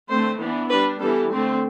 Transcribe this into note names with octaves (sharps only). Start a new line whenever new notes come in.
D3 A3 C4 C5
E3 B3 D4
G3 D4 B4
E3 G3 B3 A4
D3 A3 C4